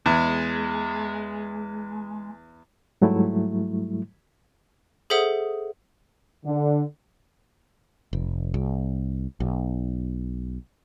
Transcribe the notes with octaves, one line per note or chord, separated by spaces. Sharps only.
E2 G#3
G#2 F#3 G3 A3 E4
G#4 A4 C5 E5 F#5 D#6
D3
F1
C2
B1